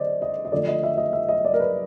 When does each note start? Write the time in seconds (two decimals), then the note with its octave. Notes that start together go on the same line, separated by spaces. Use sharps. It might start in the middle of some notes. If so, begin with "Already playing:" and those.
Already playing: D3 C5 D5 D#5
0.22 D#5
0.45 D#5
0.52 D3 F3 A3 D5
0.68 D#5
0.83 E5
0.98 D#5
1.13 E5
1.28 D#5
1.45 D5
1.54 A#4
1.60 B4